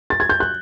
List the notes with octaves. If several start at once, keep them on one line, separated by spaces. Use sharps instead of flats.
A6
G#6
G6
F#6